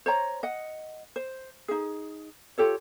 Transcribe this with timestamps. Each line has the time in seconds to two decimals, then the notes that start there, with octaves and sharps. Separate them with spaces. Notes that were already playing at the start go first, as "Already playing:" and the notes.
0.06 C5 C#5 A#5
0.43 D#5 F#5
1.16 C5
1.68 D#4 G#4
2.58 F4 G4 A4 C#5